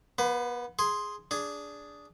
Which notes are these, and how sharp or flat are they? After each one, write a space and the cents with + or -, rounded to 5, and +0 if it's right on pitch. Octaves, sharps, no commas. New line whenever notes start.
B3 -35 B4 +30
G#4 +0 C6 +0
D4 -10 G#4 +0